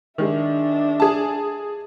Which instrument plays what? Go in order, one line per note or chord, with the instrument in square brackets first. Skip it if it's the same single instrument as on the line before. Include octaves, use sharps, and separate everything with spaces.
[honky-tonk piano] D#3 G#3 [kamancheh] D4 E5
[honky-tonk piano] G#4 A5